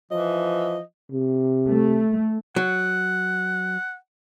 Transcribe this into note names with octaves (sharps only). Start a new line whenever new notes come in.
E3 F3 D#5
C3
A3
F#3 F#5